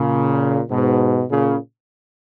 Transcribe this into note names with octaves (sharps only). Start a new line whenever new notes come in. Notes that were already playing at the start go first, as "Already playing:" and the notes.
Already playing: A#2 C#3
G#2 B2
A#2 C#3